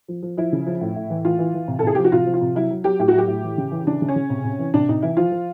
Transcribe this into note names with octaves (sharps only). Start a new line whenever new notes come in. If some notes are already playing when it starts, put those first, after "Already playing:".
F3
F3
F3 E4
C#3
F3
A2
A2
E3
E3 F4
E3
E3
C3
A4
C3 G#4
F3 G4
F#4
C3 F4
F3
F4
C3
F#3 E4
F#3
F#3 G4
A2 G4
F#4
F#3 G4
A2
E3
C#3
E3
C#3 D4
C#3
C#4
C#3
C3
C3
E3
C3 D4
C3 D#4
E3 E4
F3 F4
F3